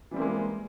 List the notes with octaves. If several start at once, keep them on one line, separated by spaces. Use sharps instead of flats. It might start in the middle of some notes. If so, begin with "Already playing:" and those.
E3 G3 G#3 A#3 C4